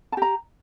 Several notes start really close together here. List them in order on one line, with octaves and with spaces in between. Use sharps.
A5 G4 A#5